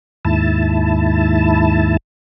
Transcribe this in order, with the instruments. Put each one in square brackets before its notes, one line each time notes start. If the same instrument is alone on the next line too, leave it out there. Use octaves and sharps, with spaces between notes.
[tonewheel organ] D#2 G#2 E4 A5